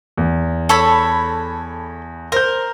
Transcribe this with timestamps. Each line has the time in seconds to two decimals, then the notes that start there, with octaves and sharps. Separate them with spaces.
0.17 E2
0.69 A4 C#5 B5
2.32 A#4 C5 G6